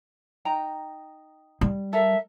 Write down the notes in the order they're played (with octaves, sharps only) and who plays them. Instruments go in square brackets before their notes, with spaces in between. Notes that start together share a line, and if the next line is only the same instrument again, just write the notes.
[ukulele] D#4 G5 A#5
[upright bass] G3
[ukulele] A4 A#4 [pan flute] E5